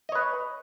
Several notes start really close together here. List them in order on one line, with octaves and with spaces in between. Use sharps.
D#5 C#5 B4